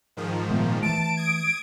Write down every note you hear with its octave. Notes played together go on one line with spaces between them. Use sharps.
G#2 D#3 F3
A#2 A3 B3
E3 A3 A5 D7
D#6 G#6